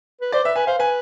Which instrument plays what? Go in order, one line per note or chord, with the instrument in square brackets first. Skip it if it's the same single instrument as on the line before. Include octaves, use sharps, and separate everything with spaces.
[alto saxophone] B4
[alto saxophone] C5 [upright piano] D5
[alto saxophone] B4 [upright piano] E5
[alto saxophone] B4 [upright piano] G#5
[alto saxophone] C5 [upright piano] F5
[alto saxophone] B4 [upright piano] G#5